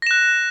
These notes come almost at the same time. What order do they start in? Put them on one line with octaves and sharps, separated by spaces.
A#6 E7 F#6